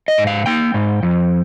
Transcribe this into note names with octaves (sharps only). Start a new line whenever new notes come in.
D#5
G#2
F5
A#3 G5
G#2
F2